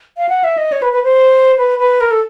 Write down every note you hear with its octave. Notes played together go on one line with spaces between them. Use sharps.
F5
F#5
E5
D#5
C#5
B4
B4
C5
B4
B4
A#4
A4